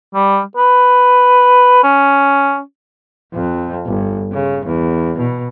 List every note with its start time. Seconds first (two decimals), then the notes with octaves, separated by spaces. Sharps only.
0.15 G3
0.57 B4
1.84 C#4
3.34 F2
3.86 G1
4.32 C#3
4.66 E2
5.19 B2